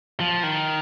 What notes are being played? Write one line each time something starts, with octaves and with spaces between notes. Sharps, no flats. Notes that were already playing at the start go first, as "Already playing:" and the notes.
F3
D#3